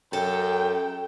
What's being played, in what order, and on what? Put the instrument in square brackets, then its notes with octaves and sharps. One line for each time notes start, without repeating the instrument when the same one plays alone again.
[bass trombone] F#2 [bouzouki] A4 [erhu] G5